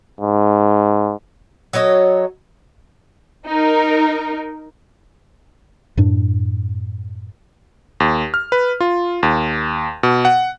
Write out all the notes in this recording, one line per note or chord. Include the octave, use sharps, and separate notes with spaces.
G#2
F#3 A4 C#5 D#5
D#4 A#4
F#2 A2 D4
D#2
F6
B4
F4
D#2
B2
F#5